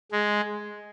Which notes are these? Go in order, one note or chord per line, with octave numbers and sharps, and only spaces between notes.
G#3